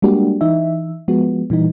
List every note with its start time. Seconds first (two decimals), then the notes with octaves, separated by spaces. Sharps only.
0.02 G3 G#3 A#3 D4 F#4 G4
0.41 E3 D#4 E5
1.08 F3 G#3 B3 F#4
1.50 A#2 E3 G3 D#4